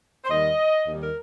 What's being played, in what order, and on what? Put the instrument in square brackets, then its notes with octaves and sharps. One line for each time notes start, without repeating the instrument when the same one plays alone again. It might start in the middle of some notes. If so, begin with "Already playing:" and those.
[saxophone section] C5
D#2 D#3 G3 D#5
D#2 D#3 G3
A#4